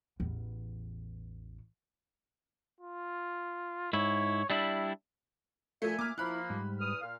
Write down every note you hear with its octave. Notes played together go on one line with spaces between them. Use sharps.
A1 E2
F4
G#2 E4 C#5
G3 D4 E4 E5
A#2 F3 A3 E5 G#5
A#3 D6 F6
F3 A#3 E4 B5 F#6
G#2 G3
E2 D#6 F6
A#2 F5